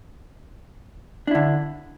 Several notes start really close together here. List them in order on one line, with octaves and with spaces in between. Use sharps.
D4 E4 D3